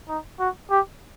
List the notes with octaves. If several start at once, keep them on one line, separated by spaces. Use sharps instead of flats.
D#4
F#4
G4